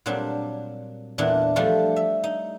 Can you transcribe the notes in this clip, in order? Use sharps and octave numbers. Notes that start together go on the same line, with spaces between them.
A#2 F#3 G3 C4 D4
E2 A#2 E3 D4
F3 G3 A3 D4 F4
E5
D#4